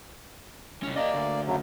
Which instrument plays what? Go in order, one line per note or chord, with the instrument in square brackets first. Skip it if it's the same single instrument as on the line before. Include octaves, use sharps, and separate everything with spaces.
[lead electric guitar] C2 C#4
[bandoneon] A#3 D5 [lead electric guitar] G4 D#5
[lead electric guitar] D2
[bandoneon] F#2 C#3 F#3